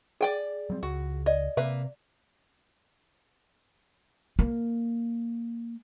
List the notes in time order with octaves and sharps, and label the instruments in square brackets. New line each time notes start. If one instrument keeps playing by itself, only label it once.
[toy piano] G#4 [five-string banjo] D5 G5 G#5
[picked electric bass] F#3 G3 C4
[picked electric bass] C#2 [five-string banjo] F#4
[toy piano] D5 [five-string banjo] D#5
[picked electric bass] C3 [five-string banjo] A#3 B4 E5
[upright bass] A#3